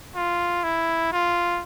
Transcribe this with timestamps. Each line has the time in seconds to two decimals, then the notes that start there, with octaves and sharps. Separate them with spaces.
0.16 F4
0.64 E4
1.12 F4